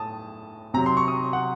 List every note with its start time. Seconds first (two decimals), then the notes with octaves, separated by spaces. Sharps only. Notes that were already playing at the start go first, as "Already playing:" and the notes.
Already playing: A2 A5 D#6
0.74 C3 F#3 A#5
0.86 C6
0.97 C#6
1.08 D#6
1.33 F#5